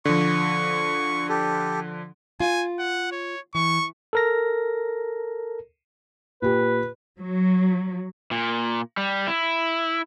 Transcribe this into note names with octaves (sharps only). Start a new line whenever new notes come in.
D3 F3 C#6
G4 A4
F4 G#5
F#5
C#5
E3 C#6
A4 A#4 A#6
A#2 G4 B4
F#3
A#2
G3
E4